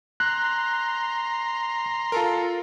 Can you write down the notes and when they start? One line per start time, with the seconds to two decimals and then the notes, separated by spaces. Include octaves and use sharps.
0.20 A#5 C6 F#6
2.12 F4 A4 A#4